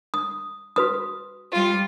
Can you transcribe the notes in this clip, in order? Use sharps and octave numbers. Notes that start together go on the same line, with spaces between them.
D#6
F#4 B4 D#6
G3 F4